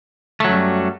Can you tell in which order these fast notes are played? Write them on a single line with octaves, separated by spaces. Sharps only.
A3 F#3 F#2 G3